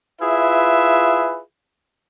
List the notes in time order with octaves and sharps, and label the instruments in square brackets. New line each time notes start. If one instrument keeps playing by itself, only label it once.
[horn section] E4 F4 G#4 B4 E5